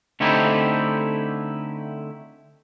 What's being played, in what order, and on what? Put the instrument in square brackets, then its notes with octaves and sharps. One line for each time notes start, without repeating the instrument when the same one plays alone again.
[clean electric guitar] D3 A3 C4 D#4 E4 G4